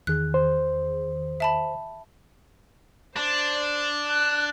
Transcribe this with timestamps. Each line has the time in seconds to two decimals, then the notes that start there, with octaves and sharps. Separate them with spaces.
0.07 E2 D#3 G#4 F#6
0.34 C5
1.40 E5 A5 B5
3.16 D4 C5
4.07 F#6